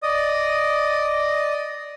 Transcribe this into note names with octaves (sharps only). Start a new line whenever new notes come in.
D5 D#5 D#6